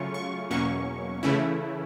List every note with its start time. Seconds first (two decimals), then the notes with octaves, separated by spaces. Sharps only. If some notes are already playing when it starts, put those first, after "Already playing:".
Already playing: C#3 F#3 A3 C#4 F4 C#6
0.14 C#6
0.50 E2 B2 F#3 A#3 C#4 C#6
1.23 C#3 E3 A3 C#4 E4